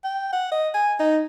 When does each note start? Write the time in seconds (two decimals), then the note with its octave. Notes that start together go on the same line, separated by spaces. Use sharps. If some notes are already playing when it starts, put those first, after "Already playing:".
0.04 G5
0.32 F#5
0.52 D#5
0.74 G#5
1.00 D#4